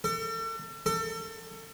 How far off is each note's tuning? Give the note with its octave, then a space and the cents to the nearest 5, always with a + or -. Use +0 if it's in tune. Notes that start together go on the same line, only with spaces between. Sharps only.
A4 +40
A4 +35